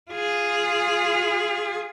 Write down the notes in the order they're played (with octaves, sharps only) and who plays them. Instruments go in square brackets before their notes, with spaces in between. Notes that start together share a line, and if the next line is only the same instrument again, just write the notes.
[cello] F4 G#4